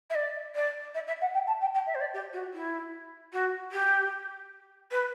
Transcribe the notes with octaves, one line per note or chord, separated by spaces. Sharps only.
E5
D5
D5
E5
E5
F#5
G5
A5
G5
G5
E5
C5
D5
G4
F#4
E4
F#4
G4
B4